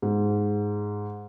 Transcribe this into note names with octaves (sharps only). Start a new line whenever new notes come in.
G#2